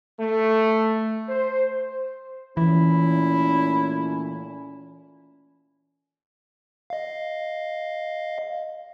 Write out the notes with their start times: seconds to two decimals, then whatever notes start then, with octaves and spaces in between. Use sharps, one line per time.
0.18 A3
1.29 C5
2.57 A#2 E3 A3 C#4 E4
6.90 D#5 F5